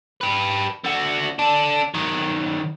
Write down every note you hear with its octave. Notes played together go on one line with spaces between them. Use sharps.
G4 B4
D3 F#4
D4 A4
D#3 F#3